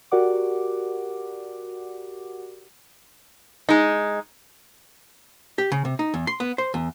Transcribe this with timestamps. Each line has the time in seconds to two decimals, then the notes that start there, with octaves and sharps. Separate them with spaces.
0.11 F#4 G4 A#4 D5 F#5 D6
3.69 G#3 D#4
5.58 G4
5.72 C#3
5.85 C3
5.99 D#4
6.14 E2
6.27 C6
6.40 B3
6.58 C5
6.74 E2